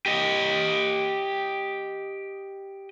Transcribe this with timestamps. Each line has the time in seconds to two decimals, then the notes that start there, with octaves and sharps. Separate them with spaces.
0.06 G4 D#5